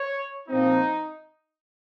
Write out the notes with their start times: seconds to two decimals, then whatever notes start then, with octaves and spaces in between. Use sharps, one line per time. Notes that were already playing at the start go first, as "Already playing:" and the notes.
Already playing: C#5
0.48 A#2 F3 C4 D#4